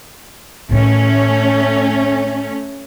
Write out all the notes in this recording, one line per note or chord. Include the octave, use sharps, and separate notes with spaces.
A2 D#3 A3 C#4